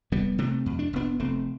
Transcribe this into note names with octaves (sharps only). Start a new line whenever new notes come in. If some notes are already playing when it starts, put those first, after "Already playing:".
F1 G3 B3
C3 A3 C4
F2
D4
F1 B3 D4
F1 A3 C4